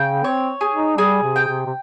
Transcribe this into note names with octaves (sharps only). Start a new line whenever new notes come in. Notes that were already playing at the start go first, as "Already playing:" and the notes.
Already playing: C#3 G5
C4 C#5
G#4
D#4
G3 G#4
C3
G5
C3
C3